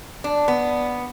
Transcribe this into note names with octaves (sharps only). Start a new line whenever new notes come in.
D4
B3